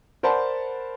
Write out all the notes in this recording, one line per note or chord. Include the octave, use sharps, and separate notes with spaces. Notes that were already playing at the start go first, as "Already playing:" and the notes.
A#4 C5 D5 F#5 A5 B5